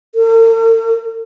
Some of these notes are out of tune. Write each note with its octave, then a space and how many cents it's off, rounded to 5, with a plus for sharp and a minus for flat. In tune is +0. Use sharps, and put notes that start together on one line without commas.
A#4 -45